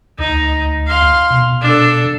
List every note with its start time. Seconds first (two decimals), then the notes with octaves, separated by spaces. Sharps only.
0.19 D2 D#4
0.87 F5 C6
1.30 B2
1.62 D4 A4